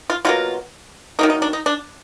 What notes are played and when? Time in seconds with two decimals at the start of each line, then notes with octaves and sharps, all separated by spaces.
0.10 F4
0.25 B2 F#3 A#3 F4
1.19 D#3 F#3 A#3 D#4
1.30 D#4
1.42 D4
1.53 D#4
1.66 D4